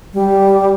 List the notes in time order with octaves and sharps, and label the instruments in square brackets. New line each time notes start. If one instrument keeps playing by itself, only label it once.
[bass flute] G3